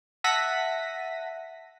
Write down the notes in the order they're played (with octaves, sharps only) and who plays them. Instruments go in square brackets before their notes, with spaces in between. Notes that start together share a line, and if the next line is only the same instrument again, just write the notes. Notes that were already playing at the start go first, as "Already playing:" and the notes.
[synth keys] E5 F#5 A5 A#6 B6 D#7